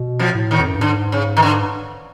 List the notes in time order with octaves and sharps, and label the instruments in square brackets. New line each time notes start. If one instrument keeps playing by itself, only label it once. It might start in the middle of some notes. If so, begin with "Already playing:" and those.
Already playing: [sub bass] B2
[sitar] F2 F3
[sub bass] A2
[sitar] D#2 D#3
[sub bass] F2
F#2
G2
[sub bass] G#2 [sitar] D3
[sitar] C#3
D#3
D3